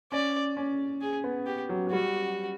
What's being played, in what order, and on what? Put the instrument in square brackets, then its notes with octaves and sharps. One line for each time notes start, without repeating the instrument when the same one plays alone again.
[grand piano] C#4 [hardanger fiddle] D5
[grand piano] C#4
[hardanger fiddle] G#4
[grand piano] B3
[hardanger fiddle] G4
[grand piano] F#3
F#3
[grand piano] G3 [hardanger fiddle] F#4